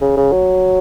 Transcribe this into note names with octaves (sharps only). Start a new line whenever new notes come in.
C#3
C#3
F#3